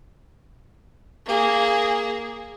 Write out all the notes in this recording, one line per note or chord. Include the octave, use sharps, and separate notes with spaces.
A#3 G#4